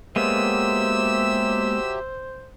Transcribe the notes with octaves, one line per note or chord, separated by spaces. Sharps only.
F#3 G#3 A#3 B3 G4 C5 E5 E6